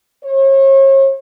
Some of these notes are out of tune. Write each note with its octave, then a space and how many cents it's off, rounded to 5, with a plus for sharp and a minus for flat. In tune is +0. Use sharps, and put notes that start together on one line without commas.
C#5 -40